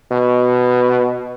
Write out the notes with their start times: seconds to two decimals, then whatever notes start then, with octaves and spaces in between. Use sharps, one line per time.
0.12 B2